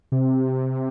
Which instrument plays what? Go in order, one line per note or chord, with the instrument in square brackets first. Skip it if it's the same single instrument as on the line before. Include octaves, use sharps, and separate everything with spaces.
[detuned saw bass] C3